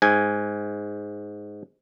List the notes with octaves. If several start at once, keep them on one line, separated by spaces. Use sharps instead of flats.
G#2 G#5